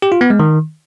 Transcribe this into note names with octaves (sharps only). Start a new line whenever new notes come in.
G4
F4
B3
G#3
D#3